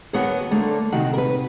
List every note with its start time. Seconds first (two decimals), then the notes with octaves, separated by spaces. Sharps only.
0.13 D#2 B3 F#4 G#4 C#5 F#5
0.51 D3 A3 A#3 D4
0.93 C3 D#3 F#4 F#5
1.13 A#4 B4